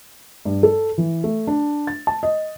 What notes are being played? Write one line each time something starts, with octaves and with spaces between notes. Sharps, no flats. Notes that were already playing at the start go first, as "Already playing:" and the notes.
G2
A4
E3
A3
D4
A6
A5
D#5